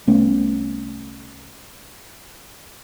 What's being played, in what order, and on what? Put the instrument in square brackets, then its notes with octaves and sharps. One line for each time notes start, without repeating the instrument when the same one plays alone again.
[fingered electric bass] C2 A3 B3 C#4